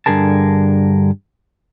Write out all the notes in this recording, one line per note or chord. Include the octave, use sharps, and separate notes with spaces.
G2 D3 G#4 A#4 A5